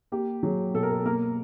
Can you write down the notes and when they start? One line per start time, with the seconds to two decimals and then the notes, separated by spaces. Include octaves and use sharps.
0.12 A#3 G4
0.43 F#3 G#4
0.74 B2 A4
0.83 A#4
0.92 A4
1.05 A#3 A#4